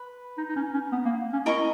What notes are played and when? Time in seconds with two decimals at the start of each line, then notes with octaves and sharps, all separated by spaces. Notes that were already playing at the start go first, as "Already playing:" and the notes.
Already playing: B4
0.38 D#4
0.48 D#4
0.56 C#4
0.74 C#4
0.92 B3
1.05 A#3
1.33 C#4
1.46 E4 A#4 D#5 A#5 C#6